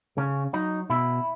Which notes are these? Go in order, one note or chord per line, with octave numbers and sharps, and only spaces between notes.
C#3 C#4
F#3 D#4
B2 E4